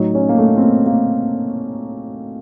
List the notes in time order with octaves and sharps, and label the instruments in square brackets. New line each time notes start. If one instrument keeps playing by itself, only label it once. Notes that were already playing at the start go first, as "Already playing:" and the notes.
Already playing: [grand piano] A2 F#3 D#4
C#4
A#3
A3
C4
A#3
A#3